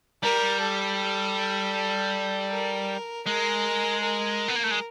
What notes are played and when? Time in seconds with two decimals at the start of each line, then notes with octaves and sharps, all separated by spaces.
0.23 G3 A#4
0.61 A4
2.50 A#4
3.26 G#3 A#4
4.03 A#4
4.48 B3
4.56 A#3
4.63 A3
4.71 G#3